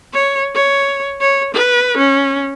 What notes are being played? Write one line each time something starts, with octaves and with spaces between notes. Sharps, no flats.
C#5
C#5
C#5
B4
C#4